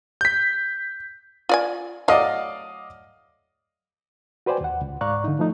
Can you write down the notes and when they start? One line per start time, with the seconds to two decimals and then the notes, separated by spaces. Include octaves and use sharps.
0.21 G6 B6
1.49 F4 D5 G#5
2.08 F#3 A3 D5 D#5 F5
4.46 F#4 B4 C5 D5 G5 G#5
4.61 D#2 F#5
4.81 C#2
5.01 G#2 D5 F5 A#5 C#6 F#6
5.24 D3 D#4
5.39 F3 A3 D#4